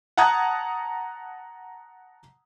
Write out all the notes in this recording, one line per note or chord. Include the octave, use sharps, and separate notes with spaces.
F#5 A5 A#5 D#6 F#6 G#6